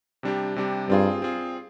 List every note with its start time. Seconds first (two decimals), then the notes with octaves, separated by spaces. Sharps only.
0.23 C3 G3 D4 G4
0.56 C3 G3 D4 G4
0.89 G2 C4 F4 G#4
1.22 C4 F4 G#4